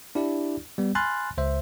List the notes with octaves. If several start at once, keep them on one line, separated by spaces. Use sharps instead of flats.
D4 E4 G4 D5
G3 B3
G#5 B5 C6 F6 F#6 A6
C#2 C5 E5